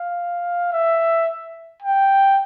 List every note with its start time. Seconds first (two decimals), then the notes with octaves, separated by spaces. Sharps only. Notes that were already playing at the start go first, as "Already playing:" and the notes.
Already playing: F5
0.73 E5
1.82 G5